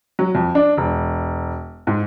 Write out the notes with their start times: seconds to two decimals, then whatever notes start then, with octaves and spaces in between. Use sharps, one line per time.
0.19 F#3
0.35 F2
0.55 D4
0.77 E1
1.87 G#2